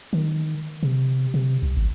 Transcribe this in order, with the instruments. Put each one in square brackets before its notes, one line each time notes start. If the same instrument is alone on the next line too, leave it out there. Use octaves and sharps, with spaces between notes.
[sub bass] D#3
C3
C3
C2
G#1